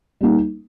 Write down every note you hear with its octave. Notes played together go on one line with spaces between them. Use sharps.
G3 A#3 D#4